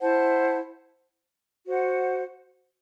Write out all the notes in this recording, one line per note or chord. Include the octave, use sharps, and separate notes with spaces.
E4 C5 F#5 A5
F#4 C5 F#5